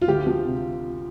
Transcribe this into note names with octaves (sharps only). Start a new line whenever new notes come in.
F4
D2 G4
F3
C3